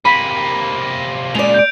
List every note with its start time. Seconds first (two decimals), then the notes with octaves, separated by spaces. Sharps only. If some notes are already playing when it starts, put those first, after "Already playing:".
0.05 C3 A#3 B5 D#7
1.35 A#2 C#3 G#3 D5 F7
1.54 G6 D7